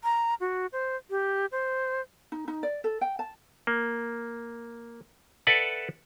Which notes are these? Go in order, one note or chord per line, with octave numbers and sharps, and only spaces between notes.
A#5
F#4
C5
G4
C5
D#4
D#4
D5
A4
G5
A5
A#3
A4 B4 D5 E5 F#5 A5